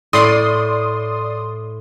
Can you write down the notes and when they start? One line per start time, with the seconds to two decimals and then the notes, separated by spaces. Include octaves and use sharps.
0.13 A2 D5 C6 D#6